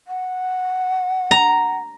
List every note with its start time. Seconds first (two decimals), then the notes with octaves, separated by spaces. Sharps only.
0.07 F#5
1.31 A#5